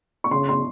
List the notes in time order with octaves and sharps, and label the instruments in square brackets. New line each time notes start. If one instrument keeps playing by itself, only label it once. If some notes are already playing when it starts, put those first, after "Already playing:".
[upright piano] C#6
[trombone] C#3 [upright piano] C6
[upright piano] C6